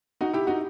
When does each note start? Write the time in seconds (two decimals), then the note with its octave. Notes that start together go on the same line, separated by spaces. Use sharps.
0.21 D#4 F#4
0.33 E4 G4
0.47 D#4 F#4